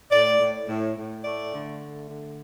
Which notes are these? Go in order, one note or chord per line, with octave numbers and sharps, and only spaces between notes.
A2 D5
A2
A2
A2
A3 D5
D3
A3
D3